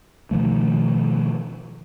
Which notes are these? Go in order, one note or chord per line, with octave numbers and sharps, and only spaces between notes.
B2 D#3 F3 A3